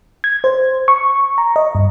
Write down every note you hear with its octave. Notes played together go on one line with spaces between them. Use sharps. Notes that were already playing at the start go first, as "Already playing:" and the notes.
G#6
C5
C#6
A#5
D#5
G2